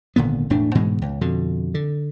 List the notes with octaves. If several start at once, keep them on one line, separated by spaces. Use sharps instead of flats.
G#1 A#2 D3 B3
E1 A2 A3 D4
G#2 B2 E3 G#3
C#2
F2 B2 D3
D3